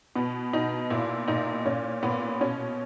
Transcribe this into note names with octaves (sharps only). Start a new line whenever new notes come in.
B2 B3
B2 D#4
A#2 E4
A#2 D#4
A#2 C#4
A#2 B3
B2 C#4